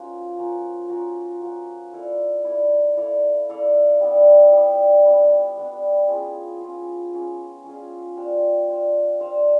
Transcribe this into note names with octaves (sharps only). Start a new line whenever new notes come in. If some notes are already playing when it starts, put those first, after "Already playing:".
Already playing: F3 A#3 C#4 F#4
F3 A#3 C#4 F#4
F3 A#3 C#4 F#4
F3 A#3 C#4 F#4
E4 A4 D5 F5
E4 A4 D5 F5
E4 A4 D5 F5
E4 A4 D5 F5
G3 B3 D4
G3 B3 D4
G3 B3 D4
G3 B3 D4
C#4 F4 G#4
C#4 F4 G#4
C#4 F4 G#4
C#4 F4 G#4
D4 G4 C5 F5
D4 G4 C5 F5
D4 G4 C5 F5